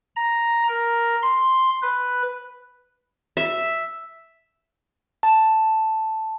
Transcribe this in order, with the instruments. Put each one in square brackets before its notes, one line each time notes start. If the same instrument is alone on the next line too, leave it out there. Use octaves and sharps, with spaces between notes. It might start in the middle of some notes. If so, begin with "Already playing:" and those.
[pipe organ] A#5
A#4
C6
B4
[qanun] E5
[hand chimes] A5